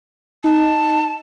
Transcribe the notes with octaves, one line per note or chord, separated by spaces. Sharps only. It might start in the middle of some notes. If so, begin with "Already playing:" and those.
D#4 A5